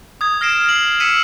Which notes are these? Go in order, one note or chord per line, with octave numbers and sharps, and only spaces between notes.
D#6 G#6
F6 A#6 C7 D7 E7
C7 F#7
E6 B6 C#7 D#7 E7